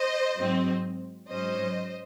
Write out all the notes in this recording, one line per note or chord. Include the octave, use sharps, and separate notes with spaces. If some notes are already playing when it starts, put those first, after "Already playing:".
Already playing: C5 D#5
G#2 F#3 C4
G#2 F#3 C#4 C5 D#5